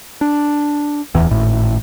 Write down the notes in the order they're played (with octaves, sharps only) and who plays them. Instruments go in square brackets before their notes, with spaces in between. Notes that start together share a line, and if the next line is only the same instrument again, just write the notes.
[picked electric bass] D4
D1 E2 E3
G#1 A2